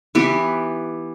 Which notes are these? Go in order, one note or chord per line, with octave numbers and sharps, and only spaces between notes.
E3 B3 G4